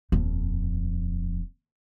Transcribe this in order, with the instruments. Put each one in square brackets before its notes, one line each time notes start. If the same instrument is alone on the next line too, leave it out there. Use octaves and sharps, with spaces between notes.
[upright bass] D#1 F2